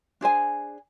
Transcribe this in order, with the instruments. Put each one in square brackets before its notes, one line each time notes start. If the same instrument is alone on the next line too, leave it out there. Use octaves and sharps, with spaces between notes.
[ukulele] D4 G#4 C5 G#5